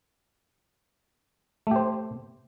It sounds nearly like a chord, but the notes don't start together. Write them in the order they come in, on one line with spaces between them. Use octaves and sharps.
A3 G4 C5